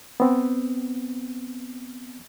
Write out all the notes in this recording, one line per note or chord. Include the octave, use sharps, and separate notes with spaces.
B3 C4